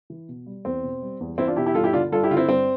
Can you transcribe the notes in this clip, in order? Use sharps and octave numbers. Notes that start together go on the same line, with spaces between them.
E3
B2
G3
E2 C4
B2
G3
E2
E2 C4 E4
D4 F4
B2 E4 G4
E4 G4
G2 F4 A4
E4 G4
D3 D4 F4
G2 F4 A4
E4 G4
D3 F4
C4 E4
G2 C4